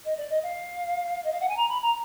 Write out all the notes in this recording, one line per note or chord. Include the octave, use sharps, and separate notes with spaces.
D#5
D5
D#5
F5
D#5
F5
F#5
G#5
A#5
B5
A#5